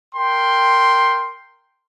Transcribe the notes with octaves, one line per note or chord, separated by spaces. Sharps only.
A#4 G5 C6